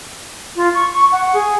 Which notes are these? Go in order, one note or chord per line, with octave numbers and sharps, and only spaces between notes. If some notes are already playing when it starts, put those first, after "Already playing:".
F4
C#6
C#6
F#5
G#4